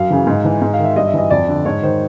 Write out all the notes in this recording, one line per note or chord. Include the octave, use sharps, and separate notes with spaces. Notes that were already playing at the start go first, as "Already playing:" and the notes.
Already playing: F#2 F5
C#3 E3
G#2
E3
G#2
F5
D#3
E5
G2 D#5
E5
E3 D#5
F2 D5
D3
G#2 C#5
D#3 C5